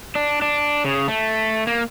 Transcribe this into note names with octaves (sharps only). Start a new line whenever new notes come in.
D4
D4
C#3
A3
A#3